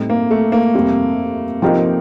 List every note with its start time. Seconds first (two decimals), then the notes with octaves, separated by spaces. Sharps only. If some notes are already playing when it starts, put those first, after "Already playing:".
Already playing: A2 G3 C4 D#4 A4
0.09 A#3
0.31 A3
0.52 A#3
0.74 F2 C3 G3 C4
1.62 F3 C4 D#4 G4 A#4